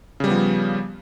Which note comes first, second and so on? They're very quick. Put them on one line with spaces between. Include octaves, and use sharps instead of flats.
C#3 G3 B3 F3